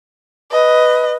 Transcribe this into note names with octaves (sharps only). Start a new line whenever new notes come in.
B4 D#5